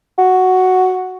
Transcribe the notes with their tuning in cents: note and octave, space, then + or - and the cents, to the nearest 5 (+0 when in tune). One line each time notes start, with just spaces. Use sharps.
F#4 +0